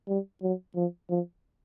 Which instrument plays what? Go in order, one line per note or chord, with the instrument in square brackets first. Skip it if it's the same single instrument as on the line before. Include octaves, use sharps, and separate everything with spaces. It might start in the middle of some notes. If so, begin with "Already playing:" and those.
[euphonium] G3
F#3
F3
F3